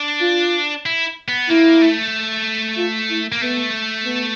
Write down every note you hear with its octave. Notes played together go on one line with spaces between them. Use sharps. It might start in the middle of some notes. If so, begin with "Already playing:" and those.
Already playing: D4
F4
E4
B3
A#3 E4
A3
F4
E4
A#3
A3 B3
B3